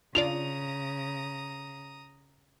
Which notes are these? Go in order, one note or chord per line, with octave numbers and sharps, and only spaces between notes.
C#3 D4 F4 D5 A#5 D#6 F7